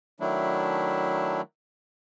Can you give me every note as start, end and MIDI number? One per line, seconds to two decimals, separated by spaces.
0.20 1.41 51
0.20 1.41 54
0.20 1.41 57
0.20 1.41 62
0.20 1.41 64